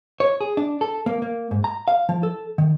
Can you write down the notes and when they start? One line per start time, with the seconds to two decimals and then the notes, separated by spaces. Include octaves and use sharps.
0.20 C#5
0.41 G#4
0.57 D4
0.81 A4
1.06 A#3
1.22 A#3
1.51 G#2
1.64 A#5
1.88 F5
2.09 F3
2.23 A4
2.58 D#3